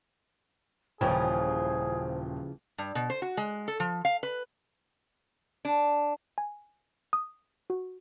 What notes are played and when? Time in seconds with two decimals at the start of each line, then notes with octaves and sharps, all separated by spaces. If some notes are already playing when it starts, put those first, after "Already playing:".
1.01 D#1 C#3 E3 F3 F4 G#4 C5 G5
2.78 G2
2.95 B2
3.10 C5
3.22 F#4
3.37 G#3
3.68 A4
3.80 F3
4.05 F5
4.23 B4
5.65 D4
6.38 G#5
7.13 D#6
7.70 F#4